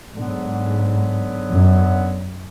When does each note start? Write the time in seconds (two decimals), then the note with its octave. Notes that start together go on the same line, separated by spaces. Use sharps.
0.16 G#2 D3 F#3 B3
1.50 F#2